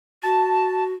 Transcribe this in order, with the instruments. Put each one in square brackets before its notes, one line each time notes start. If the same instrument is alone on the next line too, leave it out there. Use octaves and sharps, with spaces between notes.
[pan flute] F#4 [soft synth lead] A5